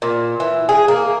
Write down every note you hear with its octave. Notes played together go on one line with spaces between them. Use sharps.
A#2
E3
G#4
A#3